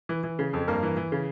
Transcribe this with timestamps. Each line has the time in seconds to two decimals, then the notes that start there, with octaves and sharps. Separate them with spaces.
0.09 E3
0.24 E3
0.39 C#3
0.53 F2 A4
0.68 G2 A#3 A#4
0.83 E3
0.97 E3
1.12 C#3